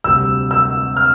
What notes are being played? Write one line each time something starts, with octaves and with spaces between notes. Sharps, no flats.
D2 C3 G3 E6
E6
F6